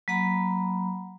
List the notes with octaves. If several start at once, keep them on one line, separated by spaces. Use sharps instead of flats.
F#3 A#3 F#5 A#5 B5